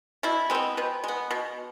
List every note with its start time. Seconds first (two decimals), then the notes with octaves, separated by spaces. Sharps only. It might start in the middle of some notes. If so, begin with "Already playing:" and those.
0.23 B2 E4
0.50 G#3 B3 C4
0.77 B2 B4
1.04 G#3 B3
1.31 B2